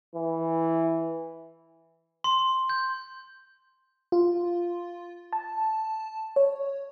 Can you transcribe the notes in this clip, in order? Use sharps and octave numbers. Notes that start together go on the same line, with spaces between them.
E3
C6
G6
F4
A5
C#5